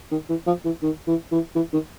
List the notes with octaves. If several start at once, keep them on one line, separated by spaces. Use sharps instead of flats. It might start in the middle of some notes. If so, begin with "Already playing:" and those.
D#3
E3
F3
E3
D#3
E3
E3
E3
D#3